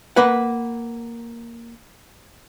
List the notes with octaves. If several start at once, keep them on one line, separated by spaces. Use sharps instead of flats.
A#3 B4 F#5